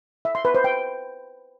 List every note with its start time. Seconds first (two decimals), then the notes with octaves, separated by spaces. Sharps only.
0.25 E5
0.35 C6
0.45 B4
0.55 C5
0.64 G5